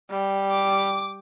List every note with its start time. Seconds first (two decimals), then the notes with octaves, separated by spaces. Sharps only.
0.10 G3
0.51 D6